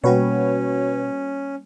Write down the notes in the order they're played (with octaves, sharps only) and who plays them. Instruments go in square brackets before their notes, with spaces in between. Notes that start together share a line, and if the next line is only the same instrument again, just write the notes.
[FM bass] B2 [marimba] G3 A#3 [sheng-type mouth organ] C#4 [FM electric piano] F#4 B4 C#5